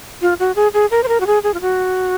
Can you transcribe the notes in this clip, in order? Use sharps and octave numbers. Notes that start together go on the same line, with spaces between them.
F4
F#4
G#4
G#4
A#4
C5
A#4
F#4
G#4
G#4
F4
F#4